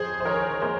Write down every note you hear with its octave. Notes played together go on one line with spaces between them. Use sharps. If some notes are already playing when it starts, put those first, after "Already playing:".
Already playing: F2 G#4 C5
C5
D#3 A#4 C#5
A#3 G#4 C5